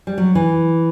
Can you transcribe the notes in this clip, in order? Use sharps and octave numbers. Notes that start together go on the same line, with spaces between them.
G3
F#3
E3